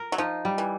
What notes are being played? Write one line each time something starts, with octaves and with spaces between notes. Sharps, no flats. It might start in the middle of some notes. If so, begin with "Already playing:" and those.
Already playing: A#4
F#3
F3 D#4
G3
E3